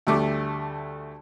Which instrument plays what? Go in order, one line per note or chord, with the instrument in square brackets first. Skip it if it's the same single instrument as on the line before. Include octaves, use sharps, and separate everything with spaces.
[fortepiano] D2 G3 A3 D6